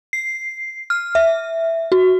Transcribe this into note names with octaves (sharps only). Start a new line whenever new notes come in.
C7
F6
E5
F#4